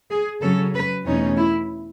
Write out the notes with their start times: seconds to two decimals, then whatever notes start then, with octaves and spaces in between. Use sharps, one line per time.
0.11 G#4
0.42 C#3 F#3 C#4 A4
0.75 B4
1.06 E2 B2 A3 C#4 D#4
1.37 E4